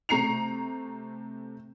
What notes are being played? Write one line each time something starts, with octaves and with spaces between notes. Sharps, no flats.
C3 A3 A#5 C7 C#7 F7